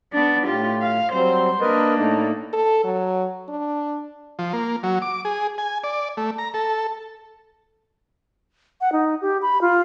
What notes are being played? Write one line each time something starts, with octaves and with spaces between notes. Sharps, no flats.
B3 D4
A2 F4 G4
F5
F#3 G3 C4 C5
A#3 D4 A#4 B4 D#5
A2 A3 D#4
A4
F#3
D4
F3
A#3
F#3
D6
G#4
G#5
D5
A3
A#5
A4
F#5
D#4
G4
B5
F4